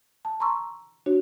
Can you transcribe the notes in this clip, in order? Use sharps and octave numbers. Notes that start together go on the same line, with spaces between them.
A5
A#5 C6 C#6 E6
D4 F#4 C#5